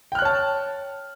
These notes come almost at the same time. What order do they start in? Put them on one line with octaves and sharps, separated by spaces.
G5 F6 F#6 C#5 A5